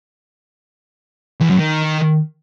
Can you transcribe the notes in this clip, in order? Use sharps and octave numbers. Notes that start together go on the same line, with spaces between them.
E2
F#2
D#3